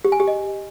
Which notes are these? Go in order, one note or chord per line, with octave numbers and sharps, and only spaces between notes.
G4
G#5
G4
D#5